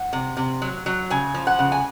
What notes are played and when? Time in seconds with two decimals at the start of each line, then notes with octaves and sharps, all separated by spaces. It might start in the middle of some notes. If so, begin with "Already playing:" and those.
Already playing: F#5
0.13 C3
0.37 C3
0.62 F#3
0.86 F#3
1.10 C#3 G#5
1.34 F3
1.47 F#5
1.59 C#3
1.72 G#5